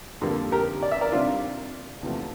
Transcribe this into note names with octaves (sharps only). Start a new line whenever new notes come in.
F2 D3 G3 A#3
G4 A#4
D5
E5
A#4 D5
C3 G3 C4 D4 F4
E2 C3 F3 A3